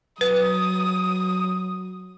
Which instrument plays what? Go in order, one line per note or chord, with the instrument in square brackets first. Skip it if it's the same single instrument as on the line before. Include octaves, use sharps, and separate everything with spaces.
[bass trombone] F#3 [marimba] B4 [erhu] D#6